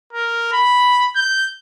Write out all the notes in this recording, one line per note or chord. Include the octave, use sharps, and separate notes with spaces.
A#4
B5
G6